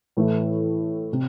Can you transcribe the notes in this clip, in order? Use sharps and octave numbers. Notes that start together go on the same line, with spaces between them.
A2 E3 A3 E4
C3